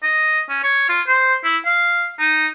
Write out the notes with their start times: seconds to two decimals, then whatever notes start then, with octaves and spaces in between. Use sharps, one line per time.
0.03 D#5
0.49 C#4
0.63 C#5
0.89 F4
1.08 C5
1.44 E4
1.66 F5
2.19 D#4